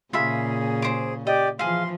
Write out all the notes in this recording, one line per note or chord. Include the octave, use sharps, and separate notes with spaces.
A#2 C#3 F4 G#4 E5 B5
C5 D6
G4 D5 D#5
E3 F3 G#4 F5 C6